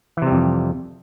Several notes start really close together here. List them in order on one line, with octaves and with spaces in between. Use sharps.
E3 C3 G3 F2